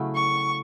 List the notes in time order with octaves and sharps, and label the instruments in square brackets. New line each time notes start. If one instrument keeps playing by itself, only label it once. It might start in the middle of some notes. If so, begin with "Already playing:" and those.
Already playing: [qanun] C#3 F#3 A3 E4
[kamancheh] C#6